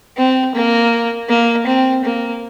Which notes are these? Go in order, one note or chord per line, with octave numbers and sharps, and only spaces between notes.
C4
A#3
A#3
C4
A#3